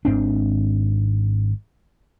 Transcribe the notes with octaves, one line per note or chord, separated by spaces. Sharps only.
G#1 G#2 C4 D4